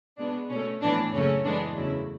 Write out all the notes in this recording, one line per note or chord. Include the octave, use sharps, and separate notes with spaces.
B2 G#3 B3 D4
B2 A3 C#4
A2 E3 B3 D4
F#2 C#3 F#3 A3 C#4
A2 E3 G#3 B3 D4
E2 C#3 F#3 A3 E4